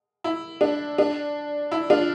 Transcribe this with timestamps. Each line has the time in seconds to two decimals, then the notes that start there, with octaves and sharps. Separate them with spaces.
0.24 E4
0.61 D4
0.98 D4
1.72 E4
1.90 D4 F4